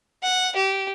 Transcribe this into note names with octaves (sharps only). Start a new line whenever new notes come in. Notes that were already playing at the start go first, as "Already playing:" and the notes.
F#5
G4